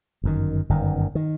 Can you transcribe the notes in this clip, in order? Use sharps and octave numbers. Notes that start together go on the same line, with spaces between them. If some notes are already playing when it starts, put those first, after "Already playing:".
G1 F#2 D#3
G1 F#2 D#3
D#3